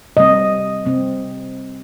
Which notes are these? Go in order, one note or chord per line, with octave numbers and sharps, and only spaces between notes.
C3 G3 C4 D#5
C3 G3 C4